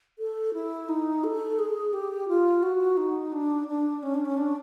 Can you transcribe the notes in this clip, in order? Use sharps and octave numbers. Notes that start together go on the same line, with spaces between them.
A4
E4
D#4
A4
G#4
G4
F4
F#4
D#4
D4
D4
C#4
D4
C#4
D4